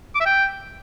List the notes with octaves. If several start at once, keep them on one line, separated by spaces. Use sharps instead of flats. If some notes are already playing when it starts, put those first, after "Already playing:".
D6
E5
G5